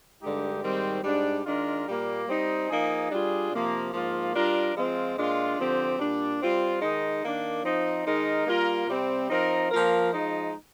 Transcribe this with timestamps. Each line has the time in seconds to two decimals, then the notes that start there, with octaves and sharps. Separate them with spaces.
0.21 G2 D3 G#3 D#4 G4
0.62 G#2 D#3 G3 C4
1.04 G#2 G3 D4
1.44 D#3 G#3 D4 F4 A#4
1.86 A#2 G3 A#3
2.27 G3 C4 D#4
2.69 F3 A#3 D#4 G#4
3.10 G3 D4 F4 G#4
3.52 C3 F3 A#3
3.92 G#2 F3 A#3 F4
4.34 G3 D4 F4 A#4
4.75 F3 G#3 C4 F4
5.17 A#2 G#3 D4 F4
5.58 D3 F3 C4 G4
5.99 A#2 G3 D4
6.40 G3 C4 F4
6.81 D#3 G#3 D#4
7.23 D#3 A#3 D4
7.64 F3 C4 D#4
8.05 D#3 G#3 D#4 A#4
8.46 G3 A#3 F4 A#4
8.87 C3 G3 C4
9.29 F3 C4 D#4 A#4
9.70 F3 A#3 F4 A#4
10.11 F3 G#3 D#4